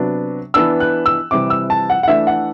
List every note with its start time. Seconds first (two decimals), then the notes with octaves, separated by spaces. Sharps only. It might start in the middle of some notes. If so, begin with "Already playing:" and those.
Already playing: C3 F#3 B3 D4
0.54 E3 B3 D4 E6
0.80 F#6
1.06 E6
1.31 C3 E3 G3 D6
1.50 E6
1.70 A5
1.90 F#5
2.03 F#5
2.08 E3 A3 D4 E5
2.27 F#5